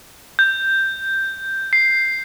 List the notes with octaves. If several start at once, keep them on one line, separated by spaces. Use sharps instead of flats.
G6
C7